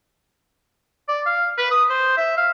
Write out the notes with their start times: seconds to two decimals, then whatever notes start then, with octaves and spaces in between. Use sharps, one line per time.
1.08 D5
1.26 F5
1.58 B4
1.71 D#6
1.89 C5
2.17 E5
2.37 F5